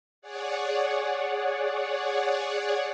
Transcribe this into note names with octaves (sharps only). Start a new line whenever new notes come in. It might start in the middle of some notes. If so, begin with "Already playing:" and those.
G#4 C#5 D5 F#5